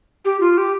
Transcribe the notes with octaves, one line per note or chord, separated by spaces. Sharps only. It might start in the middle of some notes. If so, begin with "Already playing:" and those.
G4
F4
G4